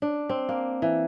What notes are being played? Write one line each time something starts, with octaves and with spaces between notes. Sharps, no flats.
D4
C4
A#3
E3